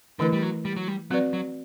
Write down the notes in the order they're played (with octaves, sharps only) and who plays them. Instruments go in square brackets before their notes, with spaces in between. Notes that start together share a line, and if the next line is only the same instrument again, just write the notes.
[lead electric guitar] D3 [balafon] E3 A3 E4 B4
[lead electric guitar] G3
F#3
G3
F#3
G3
[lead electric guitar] F#3 [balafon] C4 F#4 B4 D5
[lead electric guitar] F#3